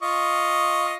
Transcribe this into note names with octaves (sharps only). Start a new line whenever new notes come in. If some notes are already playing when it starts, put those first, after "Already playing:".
F4 D#5 C#6